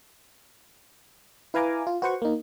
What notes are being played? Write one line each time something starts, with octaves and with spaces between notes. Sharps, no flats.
E4 B4 F5 G#5 A#5 D6
F4
F#4 B4 C5 F#5 C#6
A#3 D#4